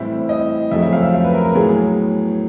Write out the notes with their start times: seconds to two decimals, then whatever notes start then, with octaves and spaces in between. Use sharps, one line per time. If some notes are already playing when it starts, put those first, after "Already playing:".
Already playing: A2 E3 G3 C4 E5
0.29 D#5
0.71 F2 C#3 F#3 A3 C4 E5
0.82 E5
0.93 F5
1.02 E5
1.13 F5
1.24 B4
1.34 A#4
1.45 A#4
1.55 A2 F#3 B3 G#4